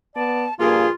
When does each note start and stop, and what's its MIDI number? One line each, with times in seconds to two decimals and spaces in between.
0.16 0.46 59
0.16 0.44 74
0.16 0.54 81
0.60 0.87 43
0.60 0.87 46
0.60 0.87 53
0.60 0.86 58
0.60 0.93 65
0.60 0.89 68